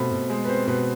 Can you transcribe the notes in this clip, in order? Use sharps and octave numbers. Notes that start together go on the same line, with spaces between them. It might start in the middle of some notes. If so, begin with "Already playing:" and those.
Already playing: B2 A3 C4 B5
B2
G#3 C5
B4
C4 C5
B2 B4